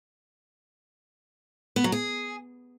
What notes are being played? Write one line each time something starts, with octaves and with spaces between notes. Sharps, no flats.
B3
F#3
G#4